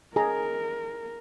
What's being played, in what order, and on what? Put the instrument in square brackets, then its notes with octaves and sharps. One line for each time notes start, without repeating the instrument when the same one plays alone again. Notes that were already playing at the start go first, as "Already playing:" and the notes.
[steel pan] G#4 A#5 [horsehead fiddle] A#4